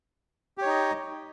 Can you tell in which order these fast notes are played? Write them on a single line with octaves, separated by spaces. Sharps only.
G4 C#5 D#4 D#5